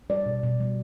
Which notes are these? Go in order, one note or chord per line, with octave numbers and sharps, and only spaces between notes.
G3 D5
B2
B2
G3